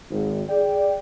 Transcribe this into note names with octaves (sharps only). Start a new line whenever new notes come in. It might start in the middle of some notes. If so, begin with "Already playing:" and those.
G#1
G#4 D5 G5